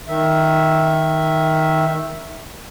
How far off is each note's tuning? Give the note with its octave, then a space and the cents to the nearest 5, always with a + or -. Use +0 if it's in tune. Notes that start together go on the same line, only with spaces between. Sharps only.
D#3 +10 E5 +0